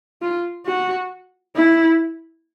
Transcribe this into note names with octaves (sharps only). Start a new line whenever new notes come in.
F4
F#4
E4